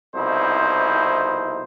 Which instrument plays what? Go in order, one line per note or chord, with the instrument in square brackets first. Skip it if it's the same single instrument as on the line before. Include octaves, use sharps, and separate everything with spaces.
[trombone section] C2 F2 B2 D#4 E4 C5